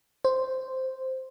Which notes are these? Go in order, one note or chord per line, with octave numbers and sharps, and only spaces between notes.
C5